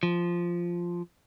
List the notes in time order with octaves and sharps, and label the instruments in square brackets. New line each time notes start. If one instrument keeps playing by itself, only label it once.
[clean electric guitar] F3